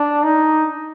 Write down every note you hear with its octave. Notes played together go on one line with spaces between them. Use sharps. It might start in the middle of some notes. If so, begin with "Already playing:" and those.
Already playing: D4
D#4